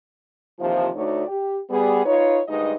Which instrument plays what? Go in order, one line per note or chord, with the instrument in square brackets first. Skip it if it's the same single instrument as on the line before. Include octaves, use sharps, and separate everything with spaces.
[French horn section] D#2 C3 E3 F3
D2 A3 D#4 F#4 C#5 D5
G4
G3 B3 G#4
D#4 F4 B4 C#5
D2 G2 G#3 D#4 D#5